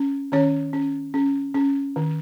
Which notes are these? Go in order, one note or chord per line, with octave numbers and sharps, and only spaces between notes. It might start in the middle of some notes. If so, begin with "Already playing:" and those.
Already playing: C#4
D#3 C#4 C#5
C#4
C#4
C#4
D#3